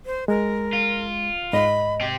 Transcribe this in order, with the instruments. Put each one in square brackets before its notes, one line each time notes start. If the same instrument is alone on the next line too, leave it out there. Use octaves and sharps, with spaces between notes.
[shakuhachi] C5
[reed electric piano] G#3 [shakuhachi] A#4
[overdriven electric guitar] F4
[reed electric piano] G#2 [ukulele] D#5 [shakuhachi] B5
[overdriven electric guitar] C4 G4